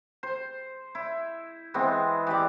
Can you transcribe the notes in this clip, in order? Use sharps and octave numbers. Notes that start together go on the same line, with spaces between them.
C5
E4
E3 G#3 B3 C4
E3 G4 D5